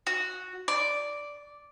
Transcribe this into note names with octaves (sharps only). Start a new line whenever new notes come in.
F#4
D5